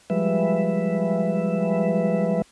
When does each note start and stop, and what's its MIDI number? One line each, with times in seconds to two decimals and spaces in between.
0.10 2.42 53
0.10 2.42 55
0.10 2.42 56
0.10 2.42 71
0.10 2.42 76